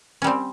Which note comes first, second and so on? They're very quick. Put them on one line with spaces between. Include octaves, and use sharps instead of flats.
C#4 G3 C4